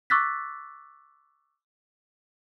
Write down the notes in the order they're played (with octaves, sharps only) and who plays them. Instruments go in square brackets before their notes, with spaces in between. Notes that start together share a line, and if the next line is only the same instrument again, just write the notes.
[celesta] C#6 D6 E6 F#6 A6 B6